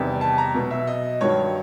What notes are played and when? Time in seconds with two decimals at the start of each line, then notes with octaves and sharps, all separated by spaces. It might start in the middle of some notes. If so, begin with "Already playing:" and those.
Already playing: E2 C3 D#3 G3
0.21 A5
0.38 A#5
0.55 B2 F#3
0.71 E5
0.87 D#5
1.21 G2 D#3 F#3 C#5